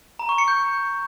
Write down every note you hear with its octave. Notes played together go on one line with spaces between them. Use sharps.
A#5
C#6
C#7
G6